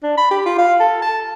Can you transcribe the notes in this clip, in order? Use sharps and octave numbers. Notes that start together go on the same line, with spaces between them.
D4
B5
G4
F4
F5
A4
A5